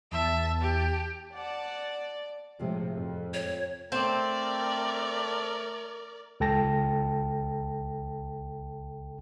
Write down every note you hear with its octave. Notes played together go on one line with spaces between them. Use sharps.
E2 E5 A5
G4
D5 F#5 A5
A2 C3 F3 G#3
F2
C#5
A3 C4 A#4 D5
C#2 A4 G5 A5 A#6